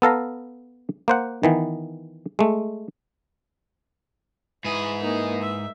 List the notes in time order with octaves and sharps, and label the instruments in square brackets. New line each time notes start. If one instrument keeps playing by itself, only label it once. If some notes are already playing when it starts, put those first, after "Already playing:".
[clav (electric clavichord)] B3 A4 F5 A#5
A#3 C5 F#5
D#3 E3 B3
G#3 A3
[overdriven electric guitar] G#2 G#4 [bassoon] E3 [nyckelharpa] B5
[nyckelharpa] A#3 D#4
E5